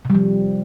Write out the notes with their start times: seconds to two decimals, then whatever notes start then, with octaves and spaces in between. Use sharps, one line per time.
0.05 C3
0.10 G3
0.15 F3